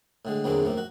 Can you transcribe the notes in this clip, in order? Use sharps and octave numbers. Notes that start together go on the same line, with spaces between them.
A2 D3 G#3
E2 D3 F#3 G#3 A#3 C4
F#2 A2 F3 A#3
F#4